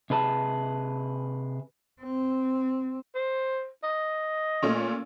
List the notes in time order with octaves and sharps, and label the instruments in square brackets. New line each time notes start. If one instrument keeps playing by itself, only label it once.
[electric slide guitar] C3 G#4 B4 A5
[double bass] C4
[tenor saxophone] C5
D#5
[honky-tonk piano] A#2 A3 C#4